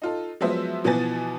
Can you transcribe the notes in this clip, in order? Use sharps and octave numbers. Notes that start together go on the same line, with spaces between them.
D#4 F4 A4
F3 F#3 G#3 B3 C5 E5
B2 E3 F3 B3 G#5 A6